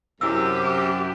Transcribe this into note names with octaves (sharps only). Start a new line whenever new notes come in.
F#2 C3 E4 G4 E6